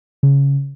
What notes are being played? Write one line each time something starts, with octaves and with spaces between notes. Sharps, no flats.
C#3